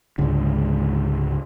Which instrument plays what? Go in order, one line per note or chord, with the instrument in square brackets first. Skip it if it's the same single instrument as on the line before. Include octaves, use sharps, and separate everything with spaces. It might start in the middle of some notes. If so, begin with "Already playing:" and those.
[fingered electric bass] C#2 G#2 D3